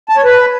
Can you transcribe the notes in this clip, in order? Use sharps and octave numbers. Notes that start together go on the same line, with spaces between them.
A5
C#5
B4